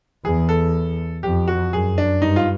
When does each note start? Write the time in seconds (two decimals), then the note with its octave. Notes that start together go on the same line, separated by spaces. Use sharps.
0.25 E2 G#4
0.49 A4
1.23 F2 G4
1.48 F#4
1.72 F#2 G#4
1.98 D4
2.22 G2 D#4
2.36 F4